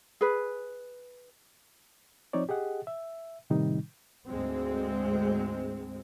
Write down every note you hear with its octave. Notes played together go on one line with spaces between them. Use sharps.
G#4 B4
F3 C4 D#4 C#5 D5
G4 G#4 D#5 F#5
E5
A2 C3 D#3 G3 D#4
D2 G#2 G#3 C4